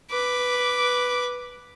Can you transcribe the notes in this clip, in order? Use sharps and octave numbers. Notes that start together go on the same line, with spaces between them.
B4 D6